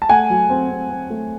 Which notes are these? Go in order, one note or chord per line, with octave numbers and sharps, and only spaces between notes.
A5
A3 F#5 G#5
F#3
C4
C4
C4
A3